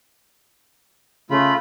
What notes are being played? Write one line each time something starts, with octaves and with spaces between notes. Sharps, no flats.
C#3 A3 F4 B5